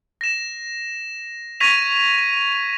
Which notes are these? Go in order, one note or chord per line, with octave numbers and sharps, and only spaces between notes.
A#6 E7
C#6 G#6 A#6 B6 D#7 F7